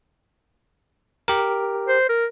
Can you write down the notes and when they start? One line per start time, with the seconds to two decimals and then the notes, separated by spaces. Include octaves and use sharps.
1.28 G4 A#4
1.88 C5
2.09 A#4